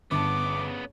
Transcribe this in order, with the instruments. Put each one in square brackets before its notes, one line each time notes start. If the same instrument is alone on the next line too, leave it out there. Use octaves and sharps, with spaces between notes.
[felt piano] G1 A5 [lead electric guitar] C#3 B3 [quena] D6